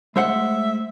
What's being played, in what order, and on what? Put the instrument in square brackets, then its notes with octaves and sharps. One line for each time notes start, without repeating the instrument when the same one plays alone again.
[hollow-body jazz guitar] G#3 C5 F#5 [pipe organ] A3 [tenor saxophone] E5